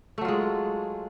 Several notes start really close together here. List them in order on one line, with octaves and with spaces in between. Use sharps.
A3 F#3 F4 G#3